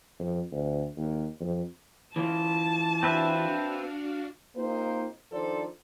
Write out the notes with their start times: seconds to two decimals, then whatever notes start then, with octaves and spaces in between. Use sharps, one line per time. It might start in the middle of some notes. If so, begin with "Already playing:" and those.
0.19 F2
0.51 D2
0.97 D#2
1.40 F2
2.16 E3 C#4 F4 A5
3.03 C4 D4 F#4 B4 E5 F5
4.56 A#3 C4 D#4 F4 G4 C5
5.31 D#3 F3 D4 A4 C5 D5